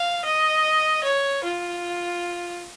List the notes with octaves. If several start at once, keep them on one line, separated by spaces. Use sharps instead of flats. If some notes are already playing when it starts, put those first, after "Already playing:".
Already playing: F5
D#5
C#5
F4